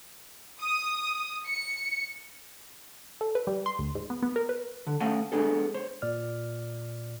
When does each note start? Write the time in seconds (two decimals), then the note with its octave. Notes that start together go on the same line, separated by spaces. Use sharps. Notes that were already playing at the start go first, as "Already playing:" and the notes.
0.60 D#6
1.47 C#7
3.21 A4
3.35 B4
3.47 G3
3.66 C6
3.79 D2
3.95 G#2
4.10 B3
4.23 B3
4.36 A#4
4.49 B4
4.87 D3
5.00 A3 C#4 F5 F#5 G#5 A5
5.32 G#3 B3 D4 G#4 A4
5.74 C5 C#5
6.02 A#2 D5 F6